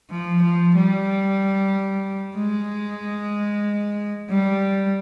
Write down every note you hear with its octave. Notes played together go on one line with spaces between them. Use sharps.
F3
F3
G3
G#3
G3